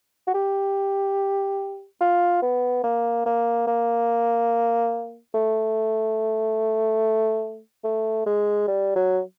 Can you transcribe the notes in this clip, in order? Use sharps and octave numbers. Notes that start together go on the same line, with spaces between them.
F#4
G4
F4
B3
A#3
A#3
A#3
A3
A3
G#3
G3
F#3